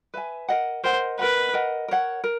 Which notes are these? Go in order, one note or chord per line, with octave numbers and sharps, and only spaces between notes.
B4 E5 G#5
A#4 D#5 F#5
A#4 C5 D#5 F#5
A#4 B4 D#5 F#5
A#4 D#5 F#5
A#4 C#5 F#5
A#4